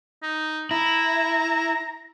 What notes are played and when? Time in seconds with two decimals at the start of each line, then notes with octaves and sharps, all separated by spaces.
0.23 D#4
0.71 E4 A#5